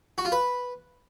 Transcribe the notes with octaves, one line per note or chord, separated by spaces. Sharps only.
F#4
F4
B4